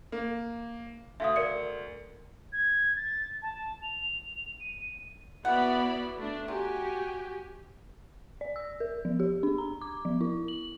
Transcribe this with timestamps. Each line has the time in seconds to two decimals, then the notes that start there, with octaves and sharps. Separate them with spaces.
0.12 A#3
1.20 D2 E5 F5 D#6
1.36 A#4 D5 C#7
2.52 G#6
2.96 A6
3.42 A5
3.83 F7
4.60 D#7
5.45 B3 E4 F#4 D5 F#5 B5
6.17 A3 D4
6.48 C3 F#4 G4 G#5
8.41 D5
8.56 E6
8.80 A#4
9.05 F3
9.20 G4
9.43 D4
9.58 A#5
9.81 D6
10.05 F3
10.21 E4
10.48 F#7